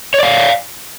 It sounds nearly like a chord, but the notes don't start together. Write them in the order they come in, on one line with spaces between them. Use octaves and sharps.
C#5 D5 F5